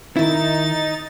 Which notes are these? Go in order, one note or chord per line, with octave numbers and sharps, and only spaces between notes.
D#3 D#4 E4 A6